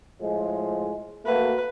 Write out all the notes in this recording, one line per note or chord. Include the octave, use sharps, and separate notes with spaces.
A2 F3 G#3
A3 A#3 F#4 B4